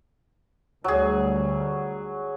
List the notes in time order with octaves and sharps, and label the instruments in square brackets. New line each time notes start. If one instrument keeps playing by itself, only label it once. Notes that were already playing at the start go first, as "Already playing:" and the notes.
[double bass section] D2 G3 [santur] F#3 G#4